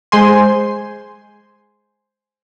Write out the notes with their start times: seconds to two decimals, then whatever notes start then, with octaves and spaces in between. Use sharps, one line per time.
0.12 G#3 C5 G#5 C6